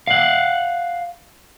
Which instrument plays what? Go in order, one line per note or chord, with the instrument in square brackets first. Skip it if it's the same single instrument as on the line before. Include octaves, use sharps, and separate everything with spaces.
[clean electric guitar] F5 F#5